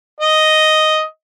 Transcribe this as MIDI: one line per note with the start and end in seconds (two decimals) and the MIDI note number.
0.21 1.01 75